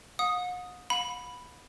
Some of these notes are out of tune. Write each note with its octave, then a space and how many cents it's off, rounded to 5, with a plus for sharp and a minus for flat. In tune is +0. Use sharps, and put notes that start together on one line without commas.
F#5 -45 D#6 +0
F5 +45 B5 +0